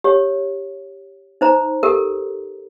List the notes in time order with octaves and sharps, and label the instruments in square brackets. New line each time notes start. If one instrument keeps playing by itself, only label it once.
[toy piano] G4 C#5
D#4 C5 A#5
G4 A4 A#4